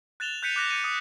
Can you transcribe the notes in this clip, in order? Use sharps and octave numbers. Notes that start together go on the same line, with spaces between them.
F#6 A6 E7 F7 G7
F#6 G6 B6 C#7 D#7 F7
D6 F#6 A#6 F7
G6 C#7 D#7
D#6